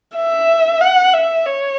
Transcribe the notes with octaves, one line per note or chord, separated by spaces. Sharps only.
E5
F#5
E5
C#5